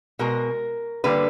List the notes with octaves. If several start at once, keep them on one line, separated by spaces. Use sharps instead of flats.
B2 G#3 A#4
D3 G3 A#3 B4